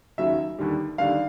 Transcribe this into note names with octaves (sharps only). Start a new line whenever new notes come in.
D#2 C#3 F#3 E5
D#2 D3 G3
D#2 D3 G3 F5